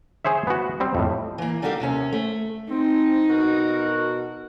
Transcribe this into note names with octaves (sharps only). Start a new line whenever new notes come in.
G#4 C5 C#5 E5
B3 F#4
G3 C4
F2 A2
E3 A#3
G3 D#4 F#4 G4 A4 F5
D#2 C3 C#4
A3
C4 D#4
B2 F#4 A#4